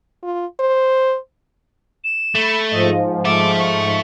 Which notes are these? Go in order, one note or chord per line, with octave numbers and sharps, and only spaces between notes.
F4
C5
E7
A3 B5 C#7
G#2 F3 D#5
A4 E5 D6
C#6